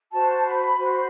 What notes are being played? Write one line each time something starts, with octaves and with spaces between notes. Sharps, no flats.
F#4 C5 A5
B5
F#4 C5 B5